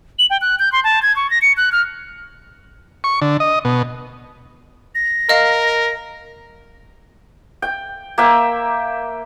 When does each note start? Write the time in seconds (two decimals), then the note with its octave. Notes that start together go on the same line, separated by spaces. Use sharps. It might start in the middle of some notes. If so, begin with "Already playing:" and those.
0.19 F#7
0.30 G5
0.41 F#6
0.59 G6
0.72 C6
0.84 A5
1.02 G#6
1.16 C#6
1.31 A#6
1.42 C#7
1.57 F#6
1.72 F6
3.04 C#6
3.22 D3
3.40 D#5
3.65 B2
4.95 A#6
5.29 A#4 D#5 F5 F6
7.62 G5
8.18 A#3 E5 G5